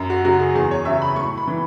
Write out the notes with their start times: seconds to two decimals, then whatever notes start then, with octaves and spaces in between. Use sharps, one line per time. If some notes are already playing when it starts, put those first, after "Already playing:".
Already playing: F#2
0.10 F#4
0.25 C#3 F#3 F#4
0.40 G#4
0.55 E2 G#4
0.71 C#5
0.85 C#3 F#3 E5
1.02 B5
1.16 A2 C#6
1.37 B5
1.47 E3